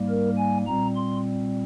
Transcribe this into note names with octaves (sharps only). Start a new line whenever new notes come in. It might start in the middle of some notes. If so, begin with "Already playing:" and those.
Already playing: G#2 G3 A#3
A#4
G#5
A#2 G3 C4 A#5
C6